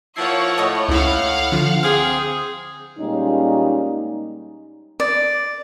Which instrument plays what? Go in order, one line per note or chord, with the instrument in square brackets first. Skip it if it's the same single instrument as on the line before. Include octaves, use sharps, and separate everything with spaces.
[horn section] F3 A#3 E4 [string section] C#5 F#5 [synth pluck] C7
[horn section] A2 [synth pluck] D#5 A5 D#6
[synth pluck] C#2 E4 [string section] F5 F#5
[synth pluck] D3 F3
[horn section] C4 G#4 [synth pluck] D6 F6
[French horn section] A#2 G3 G#3 C#4 D#4
[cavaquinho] D5